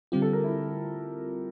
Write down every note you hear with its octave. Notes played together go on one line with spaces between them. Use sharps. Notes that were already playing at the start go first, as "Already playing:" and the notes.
D3 G3 C4 F4 G4
A4
A#4
E4